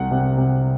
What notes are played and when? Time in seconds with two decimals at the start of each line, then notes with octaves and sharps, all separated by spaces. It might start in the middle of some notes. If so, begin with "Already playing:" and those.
Already playing: C2 F#5
0.11 C3
0.37 C3